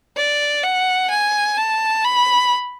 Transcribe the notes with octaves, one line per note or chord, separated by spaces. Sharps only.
D5
F#5
G#5
A5
B5